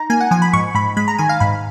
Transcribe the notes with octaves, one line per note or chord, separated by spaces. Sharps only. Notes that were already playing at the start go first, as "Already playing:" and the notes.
Already playing: D#4 A#5
A#3 G#5
F#5
F3 G#5
B5
G#2 C#6
G#2 B5
G#3 B5
A#5
D#3 G#5
F5
G#2 B5